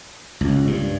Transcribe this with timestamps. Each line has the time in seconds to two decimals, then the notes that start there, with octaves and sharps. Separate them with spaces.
0.41 C#2
0.67 G2